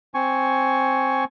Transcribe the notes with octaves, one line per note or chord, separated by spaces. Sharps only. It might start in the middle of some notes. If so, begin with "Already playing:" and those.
C4 G#5 C#6